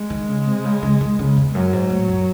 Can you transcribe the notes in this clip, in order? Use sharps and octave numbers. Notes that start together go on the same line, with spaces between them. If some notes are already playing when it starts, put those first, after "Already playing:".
Already playing: G#3
D#3
C#3
C3
C#3
C#3
D#3
C#3
E2
F#2 F#3
G#2
A2
F#2